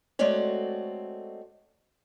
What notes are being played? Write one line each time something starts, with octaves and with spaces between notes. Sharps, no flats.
G#3 A3 C4 F#4 C#5 D5